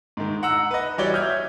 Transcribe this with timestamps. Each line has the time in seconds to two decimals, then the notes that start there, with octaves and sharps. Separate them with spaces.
0.17 G#2 D#3
0.43 F#5 A#5 E6
0.71 B4 D#5
0.98 E3 G3 F#4 C#5 D5 G7
1.12 E5 D#6 F6 G6 G#6